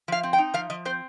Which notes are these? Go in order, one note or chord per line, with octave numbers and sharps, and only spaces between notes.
F3 F5
C4
G5
D#4
F3 F5
F3 D#5
C4 C5